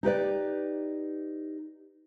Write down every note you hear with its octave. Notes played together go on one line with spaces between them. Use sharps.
D#4 G4 B4 D5